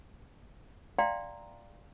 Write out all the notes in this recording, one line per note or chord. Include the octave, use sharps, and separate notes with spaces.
D5 E5 F5 G5 A#5 C6